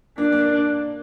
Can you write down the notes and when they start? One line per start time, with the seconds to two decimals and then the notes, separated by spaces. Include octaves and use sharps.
0.18 A#3 D4
0.32 A#3